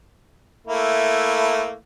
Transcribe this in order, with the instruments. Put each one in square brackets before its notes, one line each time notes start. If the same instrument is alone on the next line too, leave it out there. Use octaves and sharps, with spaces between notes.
[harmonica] A3 A#3 E4